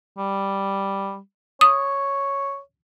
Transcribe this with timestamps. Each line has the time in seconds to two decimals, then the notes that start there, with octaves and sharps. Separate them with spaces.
0.18 G3
1.61 C#5 D#6